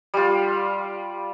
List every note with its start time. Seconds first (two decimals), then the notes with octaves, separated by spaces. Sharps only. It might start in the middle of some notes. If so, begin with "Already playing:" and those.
0.14 G3 F4